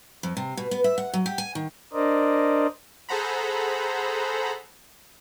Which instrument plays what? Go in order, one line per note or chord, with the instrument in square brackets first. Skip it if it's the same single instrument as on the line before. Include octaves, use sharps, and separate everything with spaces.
[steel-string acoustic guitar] F2
C3
B2
B3
E5
F#5
F#3
G4
G#5
D#3
[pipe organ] D4 A#4 C5 D5 D#5
[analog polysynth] G#4 A4 C5 F#5 A#5 B5